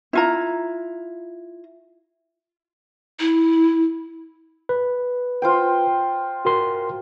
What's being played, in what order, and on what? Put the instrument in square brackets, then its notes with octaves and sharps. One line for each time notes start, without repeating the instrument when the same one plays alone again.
[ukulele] E4 F4 A#5
[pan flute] E4
[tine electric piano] B4
[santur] F4 C5 G5
[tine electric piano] F#4 A#4 C6